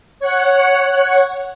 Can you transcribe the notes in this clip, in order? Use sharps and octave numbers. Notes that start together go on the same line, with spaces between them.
C#5 F#5